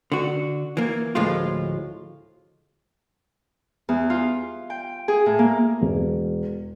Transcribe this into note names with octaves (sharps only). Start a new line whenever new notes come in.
D3 F#4
E3 A#3
D2 A2 F3 G#3 F4
E2
F4
G5
G#4
A2
A#3
E1